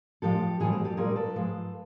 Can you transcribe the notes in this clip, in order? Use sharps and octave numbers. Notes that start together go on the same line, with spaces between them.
A2 F3 G#3 G4 A4
A2 E3 G3 C4 F#4 G#4
F#4 G#4
G4 A4
A#2 G3 C4 G#4 A#4
A4 B4
G#2 F3 G#3